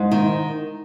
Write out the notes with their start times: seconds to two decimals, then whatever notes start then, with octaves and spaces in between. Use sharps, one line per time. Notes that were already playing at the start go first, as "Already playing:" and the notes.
Already playing: G#2
0.12 D#3